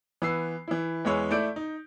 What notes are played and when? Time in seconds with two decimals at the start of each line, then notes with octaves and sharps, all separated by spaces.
0.22 E3 B3 E6 C7
0.68 E3 E4
1.05 E2 E3 G#3 B3 C#5 E6
1.31 A3 E4 D5 G6 D7
1.56 D#4